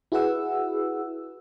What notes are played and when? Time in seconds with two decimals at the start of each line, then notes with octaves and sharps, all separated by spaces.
0.12 E4 F#4 G#4 B4 F#5 E6